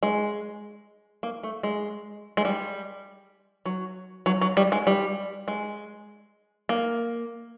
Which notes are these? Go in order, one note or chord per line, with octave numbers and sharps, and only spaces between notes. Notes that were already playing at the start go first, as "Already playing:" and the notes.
G#3
A#3
A3
G#3
G#3
G3
F#3
F#3
F#3
G3
G#3
G3
G#3
A#3